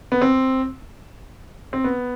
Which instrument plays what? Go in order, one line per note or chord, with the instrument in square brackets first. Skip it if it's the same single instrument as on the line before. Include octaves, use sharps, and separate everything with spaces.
[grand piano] B3
C4
C4
B3